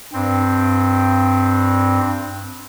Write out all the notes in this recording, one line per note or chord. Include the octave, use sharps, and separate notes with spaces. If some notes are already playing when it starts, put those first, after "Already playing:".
G2 C4